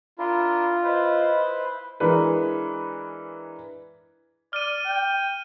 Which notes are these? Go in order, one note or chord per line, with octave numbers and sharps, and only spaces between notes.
D4 E4 F4 A#4
E4 B4 C5 D#5
E3 G#3 D4 A#4 B4
D5 F6 D#7
G5